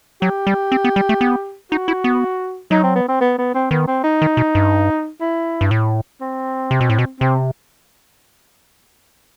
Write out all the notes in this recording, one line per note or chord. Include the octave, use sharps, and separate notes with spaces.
F#3 G4
G3
C4
B3
G3
A3
B3
D#4 F#4
E4
B3
F#3 D#4
C4
B3
C4
B3
B3
C4
D#3 B3
C4
D#4
D#3
B2
G2
E4
G2
A2
C4
C3
B2
A2
B2
C3 C4